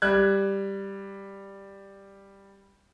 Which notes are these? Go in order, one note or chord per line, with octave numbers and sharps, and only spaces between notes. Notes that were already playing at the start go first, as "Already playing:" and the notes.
G3 F#6 G#6